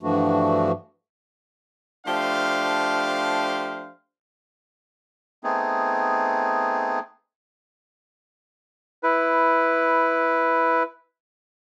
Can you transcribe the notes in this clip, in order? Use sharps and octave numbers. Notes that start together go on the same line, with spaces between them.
G2 E3 F3 A3 D4 F#4
F3 A3 D4 G4 C5 F5
A3 B3 C4 D#4 G#4
E4 B4